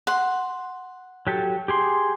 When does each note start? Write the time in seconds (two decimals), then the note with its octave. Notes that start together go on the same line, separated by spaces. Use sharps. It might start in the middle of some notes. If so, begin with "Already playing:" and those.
0.07 F#5 C6
1.27 F#3 G4 A4
1.68 G4 G#4 C6